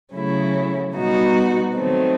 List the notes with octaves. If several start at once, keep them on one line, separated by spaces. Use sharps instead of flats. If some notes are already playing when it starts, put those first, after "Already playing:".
C#3 F#3 A3 C#4 E4
B2 G3 B3 D#4 F#4
D#3 F#3 A3 C4